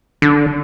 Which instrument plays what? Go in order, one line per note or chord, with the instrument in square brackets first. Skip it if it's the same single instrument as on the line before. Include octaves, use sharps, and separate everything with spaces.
[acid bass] D3